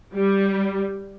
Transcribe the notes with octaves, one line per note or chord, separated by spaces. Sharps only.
G3